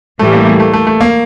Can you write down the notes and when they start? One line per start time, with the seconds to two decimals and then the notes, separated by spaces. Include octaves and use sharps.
0.19 A2 E3 G3 A3
0.33 A#3
0.46 A#3
0.60 A3
0.73 A3
0.87 A3
1.01 A#3